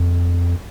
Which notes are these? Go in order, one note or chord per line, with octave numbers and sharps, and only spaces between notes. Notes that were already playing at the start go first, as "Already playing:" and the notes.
Already playing: F2